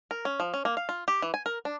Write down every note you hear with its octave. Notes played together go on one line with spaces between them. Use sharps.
A#4
C#4
F3
C#4
A#3
F5
F4
G4
E3
G#5
A#4
D4